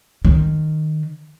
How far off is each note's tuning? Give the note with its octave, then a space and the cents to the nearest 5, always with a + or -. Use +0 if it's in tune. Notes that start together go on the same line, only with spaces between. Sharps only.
D#3 -10